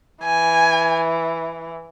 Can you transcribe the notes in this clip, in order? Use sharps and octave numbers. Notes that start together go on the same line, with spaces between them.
E3 G#5